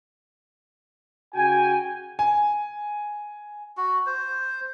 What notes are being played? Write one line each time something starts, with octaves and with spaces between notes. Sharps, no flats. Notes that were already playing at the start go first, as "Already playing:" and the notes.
C#3 F#4 G5 G#5
G#5
F#4
C5